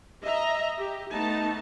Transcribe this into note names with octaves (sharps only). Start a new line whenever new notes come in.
D#5 E5 A#5
G4
A3 B3 D#4 A5